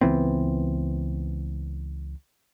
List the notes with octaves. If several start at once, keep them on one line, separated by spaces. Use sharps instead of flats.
C#2 E3 B3 C4